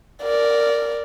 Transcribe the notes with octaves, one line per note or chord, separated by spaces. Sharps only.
A#4 D5